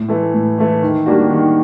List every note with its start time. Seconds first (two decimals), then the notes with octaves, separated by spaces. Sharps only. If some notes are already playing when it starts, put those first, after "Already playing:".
Already playing: A2
0.09 E3 A3
0.34 A2
0.58 E3 A3
0.82 D#3
1.06 G3 A#3 D4 F#4
1.30 D#3